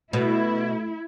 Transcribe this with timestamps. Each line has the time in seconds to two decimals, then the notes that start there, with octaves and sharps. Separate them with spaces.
0.13 B2 A3 E4